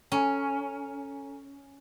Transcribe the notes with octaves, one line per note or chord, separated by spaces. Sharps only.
C#4 A4 G#5 A#5